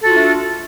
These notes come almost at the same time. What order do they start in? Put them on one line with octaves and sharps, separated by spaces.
A4 F#4 F4 D4 A3